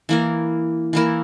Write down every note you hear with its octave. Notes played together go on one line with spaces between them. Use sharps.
E3 A#3 E4 A#4
E3 A#3 E4 A#4